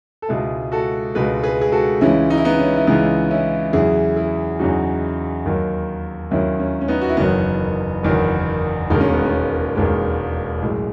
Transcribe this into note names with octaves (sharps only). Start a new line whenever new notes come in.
A4
C#2 B2 G#3 E4 G#4
F#4 A4
C#2 B2 G#3 G#4 B4
G#4 B4
G#4
F#4 A4
C#2 C#3 E3 G#3 C#4 E4
D#4
E4
B3 D#4
C#4
E4
C#2 C#3 E3 G#3 B3 D#4
C#4 E4
E2 C#3 F#3 E4 G#4
E4 G#4
E2 C#3 F#3 D#4 F#4
D#2 D#3 F#3
D#2 D#3 F#3 C#4 E4
C#4
C#4
B3 D#4
F#4
E4
F#1 E2 D#3 F#3 B3 D#4
F#1 E2 D#3 F#3
E1 D#2 D#3 G#3 D#4
C#4
B3
C#4
E1 D#2 D#3 G#3
B1 A2 G#3